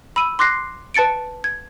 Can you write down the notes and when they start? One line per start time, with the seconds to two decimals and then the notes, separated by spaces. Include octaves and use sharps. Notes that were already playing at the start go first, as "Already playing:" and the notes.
0.16 B5 E6 D#7
0.39 C6 D6 F#6 A#6 C7
0.94 B4 A5 A6 C#7 D7
1.44 G#6